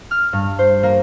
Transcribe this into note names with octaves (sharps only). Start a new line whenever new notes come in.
F6
G2
C5
A#3